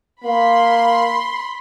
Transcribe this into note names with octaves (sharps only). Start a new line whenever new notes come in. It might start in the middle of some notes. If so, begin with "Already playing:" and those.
A#3 B5 C6